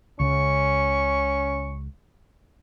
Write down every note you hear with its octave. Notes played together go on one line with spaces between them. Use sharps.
C#2 C#3 C#4 C#6